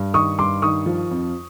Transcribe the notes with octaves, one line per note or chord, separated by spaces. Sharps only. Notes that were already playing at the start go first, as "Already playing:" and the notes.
Already playing: G2
D#3 C#6 D#6
G2 C6 D6
D#3 C#6 D#6
F3
F2